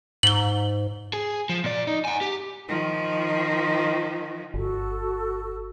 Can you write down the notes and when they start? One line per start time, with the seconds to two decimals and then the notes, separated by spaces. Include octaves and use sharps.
0.23 G#2 F#7 G7
1.13 G#4
1.49 F3
1.64 A#2 D5
1.87 D#4
2.05 F#5 G#5
2.21 G4
2.68 D#3 F3
4.54 G1 F#4 A4